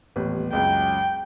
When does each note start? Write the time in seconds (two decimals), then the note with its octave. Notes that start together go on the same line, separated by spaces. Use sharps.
0.16 D#1 A1 B3
0.53 C#2 F#2 G5